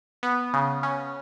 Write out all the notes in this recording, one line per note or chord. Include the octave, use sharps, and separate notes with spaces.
B3
C#3
C#4